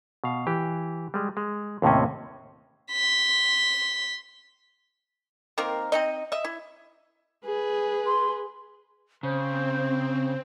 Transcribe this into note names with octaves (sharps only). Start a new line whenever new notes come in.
B2 F5
E3 G4
G3 G#3
G#3
D#2 A2 C3 C4 C#4
C6 B6
D#3 A#3 C4 A#4
C4 D#4 D#5
D#5 E5
E4
G#4 B4
C6
C#3 C4 C5